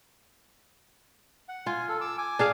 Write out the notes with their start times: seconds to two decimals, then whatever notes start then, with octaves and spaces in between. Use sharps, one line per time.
1.49 F#5
1.66 F4 G#5
1.89 A4
2.01 D6 E6
2.18 G#5 D6
2.39 D4 G#4 F5